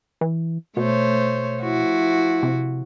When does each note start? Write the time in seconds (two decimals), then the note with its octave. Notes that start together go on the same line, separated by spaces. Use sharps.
0.21 E3
0.77 B2 A3 C5 C#5
1.62 F3 E4 F#4
2.43 C3